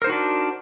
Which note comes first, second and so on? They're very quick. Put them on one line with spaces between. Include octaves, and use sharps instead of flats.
A#4 C5 D#4 F#4 D4